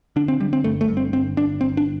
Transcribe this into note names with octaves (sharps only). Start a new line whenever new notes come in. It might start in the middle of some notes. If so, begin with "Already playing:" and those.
D3 D4
C4
D3 G3
C4
G1 A3
A3
G2
C4
G1 C4
G1 D4
G1 C4
D4